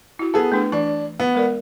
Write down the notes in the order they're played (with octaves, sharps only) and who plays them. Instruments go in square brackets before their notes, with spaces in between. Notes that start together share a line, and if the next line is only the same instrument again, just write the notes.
[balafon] E4 F#4
[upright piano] B3 G#4 A4
[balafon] A3 D4 B4
[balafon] E3 [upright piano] D4
[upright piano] B3
[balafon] G#3 A#4 D5